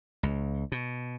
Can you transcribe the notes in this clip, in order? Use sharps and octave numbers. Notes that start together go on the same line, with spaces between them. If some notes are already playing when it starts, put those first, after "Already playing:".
C#2
B2